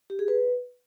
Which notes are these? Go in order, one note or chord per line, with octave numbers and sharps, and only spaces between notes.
G4
G#4
B4